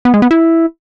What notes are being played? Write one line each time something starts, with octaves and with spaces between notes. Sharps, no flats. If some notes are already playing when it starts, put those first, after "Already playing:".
B3
G#3
B3
E4